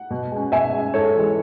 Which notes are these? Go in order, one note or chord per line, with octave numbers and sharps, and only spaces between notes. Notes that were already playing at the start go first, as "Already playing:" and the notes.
Already playing: F#5
B2
G#3 C#4
B2 E5 G#5
G#3 C#4
G#2 A4 C#5
E3 G#3